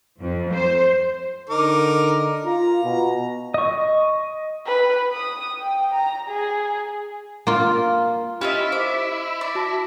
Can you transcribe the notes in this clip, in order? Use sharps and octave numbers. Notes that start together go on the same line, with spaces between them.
F2
C5
D3 D#4 A#4 D6
F4 A#5
B2
D#5 C#6
B4
D#6
G5
A#5
G#4
A#3 F4
C#4 E4 F4 G4 D#5 E5
C5 D#5 D6
D5
F#4 A5 A#6